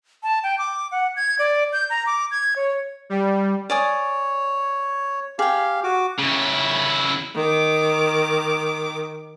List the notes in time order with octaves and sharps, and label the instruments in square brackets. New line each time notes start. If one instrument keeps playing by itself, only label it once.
[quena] A5
G5
D6
F#5
G#6
D5
G6
A#5
D6
G#6
C#5
[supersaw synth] G3
[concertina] C#5 [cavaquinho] D5 G#5 D#6
[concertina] G4 F5 [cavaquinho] G#4 G5
[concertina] F#4 D6
[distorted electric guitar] C#3 E4
[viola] D#3 D6